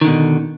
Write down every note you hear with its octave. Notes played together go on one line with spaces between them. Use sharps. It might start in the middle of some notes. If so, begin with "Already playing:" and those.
B2 D3 D#3